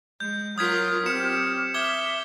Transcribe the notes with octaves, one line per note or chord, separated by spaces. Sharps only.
G#3 G6
F#3 F4 A#4 D#6 F6 G#6 B6
C4 G4 C#7 E7
E5 D6 G#6 G7